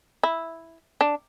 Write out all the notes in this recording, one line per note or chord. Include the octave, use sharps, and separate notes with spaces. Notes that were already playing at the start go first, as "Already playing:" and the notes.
E4
D4